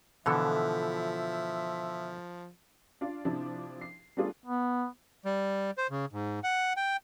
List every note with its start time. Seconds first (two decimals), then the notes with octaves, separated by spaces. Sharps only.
0.26 B2 D3 E3 F3 F4 A4 E5
3.01 D4 F4 D5 F5
3.25 C3 F3 D4 E4
3.81 C7
4.17 G3 A3 B3 D4 F4 G#4
4.46 B3
5.25 G3
5.78 C5
5.91 C#3
6.13 G#2
6.44 F#5
6.77 G5